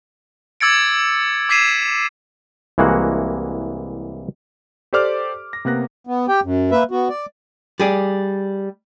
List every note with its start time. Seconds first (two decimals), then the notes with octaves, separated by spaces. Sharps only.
0.61 D6 E6 G#6 A6 C#7 D7
1.49 D6 G#6 B6 C7 D#7 E7
2.78 C2 E3 G#3 A#3 F#4 F#5
4.93 G4 A4 C5 D5 D6 F6
5.53 A#6
5.65 C3 A#3 B3 F#6 A#6
6.07 B3
6.29 G4 G5
6.44 F#2
6.71 A#3 B4 E5
6.91 B3 F#4
7.09 D5
7.80 G3 G#4 D5